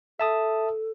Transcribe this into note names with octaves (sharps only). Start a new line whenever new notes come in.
A4 E5 A5 D#6